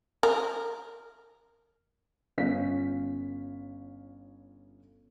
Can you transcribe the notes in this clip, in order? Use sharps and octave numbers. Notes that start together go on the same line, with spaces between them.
A#4
G1 C#4 F4 F5 B6